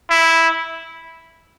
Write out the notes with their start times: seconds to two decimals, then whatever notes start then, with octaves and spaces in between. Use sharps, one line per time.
0.10 E4